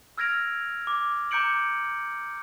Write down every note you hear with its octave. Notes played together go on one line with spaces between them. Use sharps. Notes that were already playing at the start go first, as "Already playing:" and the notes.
E6 F6 G#6 A#6 D7 F7
D6
A#5 D6 G6 C#7 D7 F#7